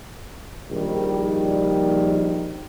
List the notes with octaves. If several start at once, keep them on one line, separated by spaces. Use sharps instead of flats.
A#1 D#3 G3